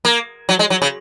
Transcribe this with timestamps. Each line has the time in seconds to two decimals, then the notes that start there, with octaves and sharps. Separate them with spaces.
0.05 A#3
0.49 F#3
0.59 G#3
0.70 F#3
0.82 C#3